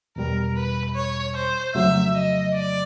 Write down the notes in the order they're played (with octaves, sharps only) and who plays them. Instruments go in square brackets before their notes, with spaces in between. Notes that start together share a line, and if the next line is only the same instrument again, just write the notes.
[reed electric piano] E2 B2 G3 [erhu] A#4
[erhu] B4
C#5
C5
[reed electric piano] F2 C#3 F#3 A3 [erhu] E5
[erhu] D#5
D5